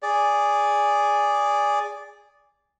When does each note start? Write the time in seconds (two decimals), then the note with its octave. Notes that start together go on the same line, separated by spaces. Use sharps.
0.03 G#4 D5